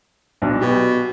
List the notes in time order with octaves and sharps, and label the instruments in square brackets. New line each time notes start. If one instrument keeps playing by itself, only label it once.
[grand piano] B1 D4
[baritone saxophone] B2 [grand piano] G4